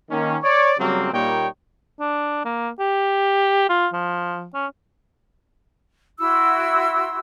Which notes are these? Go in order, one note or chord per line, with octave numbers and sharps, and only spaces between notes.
D#3 A#3 C#4
C#5 D5
C#3 F#3 G3 A#3 C4
A#2 G3 A#3 D#4 C#5 G5
D4
A#3
G4
F4
F3
C#4
E4 F#4 C6 E6